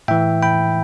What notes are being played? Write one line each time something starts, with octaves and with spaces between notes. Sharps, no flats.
A2 E3 E5 G5
G5 B5